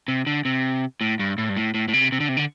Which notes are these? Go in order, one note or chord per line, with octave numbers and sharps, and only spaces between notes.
C3
D3
C3
A2
G2
A2
G2
A2
A2
A2
C3
C3
D3
C3
D3